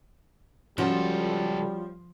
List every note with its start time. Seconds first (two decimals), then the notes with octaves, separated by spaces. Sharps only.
0.78 C#2 F3 G3 C#4 F#4 A4